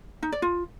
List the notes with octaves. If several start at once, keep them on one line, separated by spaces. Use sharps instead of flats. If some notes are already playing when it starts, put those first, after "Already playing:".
D#4
D5
F4